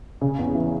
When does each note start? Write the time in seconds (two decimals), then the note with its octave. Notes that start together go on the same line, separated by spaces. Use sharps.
0.21 C#3
0.39 E2
0.55 E3